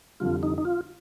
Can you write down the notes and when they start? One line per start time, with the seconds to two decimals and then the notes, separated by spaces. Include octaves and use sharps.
0.20 F1 F2 D3 G3 F4
0.43 D#4
0.58 D#4
0.65 F4